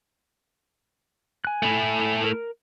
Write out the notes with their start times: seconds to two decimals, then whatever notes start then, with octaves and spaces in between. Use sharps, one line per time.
1.45 G#5 F#6
1.63 A3 E4
2.24 A#4